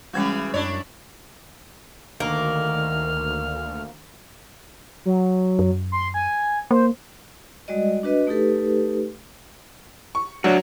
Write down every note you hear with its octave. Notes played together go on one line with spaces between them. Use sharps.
C#3 E3 G3 G#3 C#4 F#4
F#2 D4 E4 C#5
D2 D#3 A#3 F6
F#3
F#2
C6
G#5
A#3 C5
G3 G#3 F#4 D5 D#5
D4 F#4 B4 D#5
A3 D#4 G4 A4 B4
C#6
F#3 D4 F#4